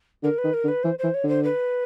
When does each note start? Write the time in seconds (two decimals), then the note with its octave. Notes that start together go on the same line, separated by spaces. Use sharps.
0.23 D3 A#4
0.38 B4
0.44 D#3
0.54 A#4
0.64 D3
0.68 B4
0.83 E3 C5
0.99 E3 C5
1.14 C#5
1.24 D3 C5
1.44 B4